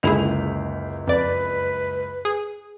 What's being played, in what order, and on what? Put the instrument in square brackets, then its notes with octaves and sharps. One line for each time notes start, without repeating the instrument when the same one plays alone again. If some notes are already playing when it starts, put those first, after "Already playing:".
[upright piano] F#1 C#2 F7 [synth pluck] D3 E4 G#4
[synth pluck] F2 D5 [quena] B4
[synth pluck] G#4